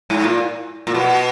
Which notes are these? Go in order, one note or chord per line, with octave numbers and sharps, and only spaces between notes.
G#2
A#2
A#2
B2